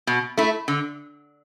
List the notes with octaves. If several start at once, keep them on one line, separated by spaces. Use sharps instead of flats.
B2
A3 E4
D3